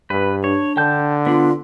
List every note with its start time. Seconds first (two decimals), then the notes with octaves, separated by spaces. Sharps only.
0.10 G2 B4
0.44 D4 C#5
0.77 D3 G5 A5 G6
1.26 B3 D4 F4